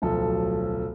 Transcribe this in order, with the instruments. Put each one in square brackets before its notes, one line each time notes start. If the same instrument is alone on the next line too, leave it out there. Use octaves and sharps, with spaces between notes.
[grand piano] D1 B1 F3 A4